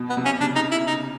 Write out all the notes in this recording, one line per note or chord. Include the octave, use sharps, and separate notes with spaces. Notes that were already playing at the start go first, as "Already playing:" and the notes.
Already playing: B2
B3
C3
C#4
C#3 D4
D#4
E4
D#4